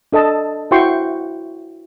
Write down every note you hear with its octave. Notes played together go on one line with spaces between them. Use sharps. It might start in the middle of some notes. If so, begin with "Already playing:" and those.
D4 A4 D#5 A5
E4 F#4 C5 G5 C6 C#6